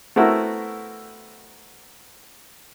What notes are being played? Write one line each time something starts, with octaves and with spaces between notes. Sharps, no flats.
A3 B3 C4 E4 F#4 A#4